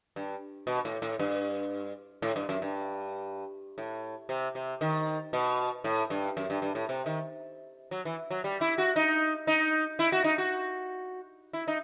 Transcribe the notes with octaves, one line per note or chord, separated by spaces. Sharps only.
G2
B2
A2
A2
G2
A2
G2
F#2
G2
A2
C3
C3
D#3
B2
A2
G2
F#2
G2
G2
A2
C3
D#3
F#3
E3
F#3
G3
E4
F#4
D#4
D#4
E4
F#4
D#4
F#4
E4
D#4